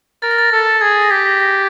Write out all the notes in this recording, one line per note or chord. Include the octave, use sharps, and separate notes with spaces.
A#4 A6
A#6
A6
A4
G#4 G#6
A6
A#6
G4 B6
A#6
A#6